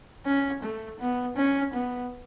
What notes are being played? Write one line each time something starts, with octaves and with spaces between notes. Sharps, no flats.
C#4
A3
B3
C#4
B3